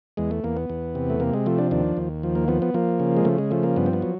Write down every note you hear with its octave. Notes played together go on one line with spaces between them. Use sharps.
E2 G#3
A3
E2 A#3
B3
E2
C3
A3
C3 A#3
G#3
F3 A3
D4
D#2 D4
D#2
F3
A#3
F3 B3
B3
F3 A#3
C#3
G#3
C#3 A3
G#3
F3 A3
A#3
G2 B3
C4
B3
F#3